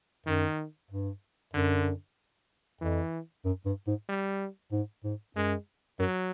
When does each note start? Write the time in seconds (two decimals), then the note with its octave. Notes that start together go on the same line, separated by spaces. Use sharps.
0.26 F#2 D#3
0.91 G2
1.54 F#2 D3
2.81 F2 E3
3.45 F#2
3.66 G2
3.87 G#2
4.09 G3
4.72 G#2
5.04 G#2
5.36 F#2 G#3
5.99 F#2 F#3